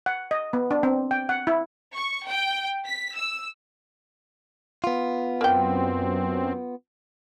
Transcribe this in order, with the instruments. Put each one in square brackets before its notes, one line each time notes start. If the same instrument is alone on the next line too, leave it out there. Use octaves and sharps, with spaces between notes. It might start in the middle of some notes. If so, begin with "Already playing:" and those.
[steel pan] F#5
D#5
B3
D4
C4
G5
F#5
E4
[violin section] C#6
G5
B6
E6
[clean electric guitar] B3 F4
[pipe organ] F#2 C4 [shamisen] A#3 G5